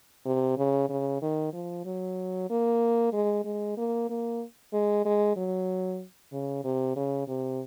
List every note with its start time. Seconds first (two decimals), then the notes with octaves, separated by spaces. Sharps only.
0.26 C3
0.57 C#3
0.89 C#3
1.22 D#3
1.53 F3
1.85 F#3
2.50 A#3
3.13 G#3
3.45 G#3
3.77 A#3
4.09 A#3
4.73 G#3
5.05 G#3
5.36 F#3
6.32 C#3
6.64 C3
6.96 C#3
7.28 C3